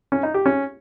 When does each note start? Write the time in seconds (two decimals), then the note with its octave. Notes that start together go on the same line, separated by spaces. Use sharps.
0.12 C#4
0.23 D#4
0.34 G4
0.46 C#4